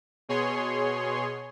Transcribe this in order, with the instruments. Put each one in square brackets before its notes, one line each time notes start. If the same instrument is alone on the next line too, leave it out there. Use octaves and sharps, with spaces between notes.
[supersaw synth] B2 G#4 C#5 C6